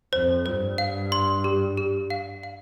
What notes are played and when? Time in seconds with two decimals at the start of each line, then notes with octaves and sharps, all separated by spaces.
0.13 F2 C5
0.46 G2 C5
0.78 F5
1.12 C6
1.44 G4
1.77 G4
2.10 F5
2.43 F5